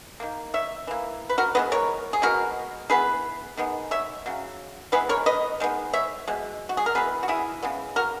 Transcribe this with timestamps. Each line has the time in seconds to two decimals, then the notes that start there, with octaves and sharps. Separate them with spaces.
0.20 D#3 A#3
0.54 C#5 E5
0.87 E3 A#3
1.29 B4
1.38 F#4 A#4
1.55 E3 G#3 B3 B4 D#5
1.72 A#4 C#5
2.13 G#4
2.22 B2 G#3 B3 F#4 A#4
2.90 E3 B3 G#4 B4
3.57 D#3 G#3 B3
3.91 C#5 E5
4.26 C#3 F#3
4.92 E3 G#3 B3 G#4 B4
5.09 A#4 C#5
5.26 B4 D#5
5.60 D#3 G#3 B3
5.93 C#5 E5
6.28 B2 G#3
6.69 F#4
6.77 G#4
6.86 A#4
6.95 E3 B3 G#4 B4
7.23 F#4
7.28 E4 G#4
7.62 C#3 G#3 B3
7.96 F#4 A#4